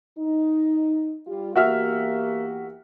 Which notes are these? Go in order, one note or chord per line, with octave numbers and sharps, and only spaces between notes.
D#4
G3 F4 G4
E2 A#3 F#4 G4 E5 F6